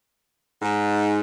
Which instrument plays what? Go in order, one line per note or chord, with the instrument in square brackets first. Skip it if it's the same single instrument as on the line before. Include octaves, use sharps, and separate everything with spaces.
[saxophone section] G#2